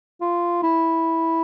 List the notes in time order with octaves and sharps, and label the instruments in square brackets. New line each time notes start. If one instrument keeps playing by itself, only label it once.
[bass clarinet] F4
E4